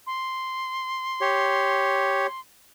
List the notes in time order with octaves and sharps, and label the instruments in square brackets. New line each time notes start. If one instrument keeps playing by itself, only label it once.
[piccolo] C6
[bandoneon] G4 C#5